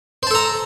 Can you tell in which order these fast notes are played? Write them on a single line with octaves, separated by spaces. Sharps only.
C5 A5 A4 A#5